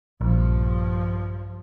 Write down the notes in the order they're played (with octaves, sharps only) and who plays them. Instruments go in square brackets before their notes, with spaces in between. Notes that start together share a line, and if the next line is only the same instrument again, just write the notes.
[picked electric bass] A#1 [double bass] G2 F3